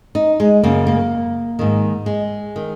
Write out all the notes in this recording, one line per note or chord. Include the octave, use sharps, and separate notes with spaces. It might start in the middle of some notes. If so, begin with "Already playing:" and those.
D#4
G#3
F#2 C#3 A#3
A#3
G#2 D#3
G#3
D#3